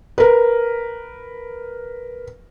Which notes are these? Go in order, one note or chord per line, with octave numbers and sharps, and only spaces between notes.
A#4 B4